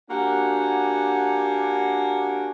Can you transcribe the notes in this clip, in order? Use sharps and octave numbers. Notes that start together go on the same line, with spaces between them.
A#3 D4 F#4 G4 F#5 G#5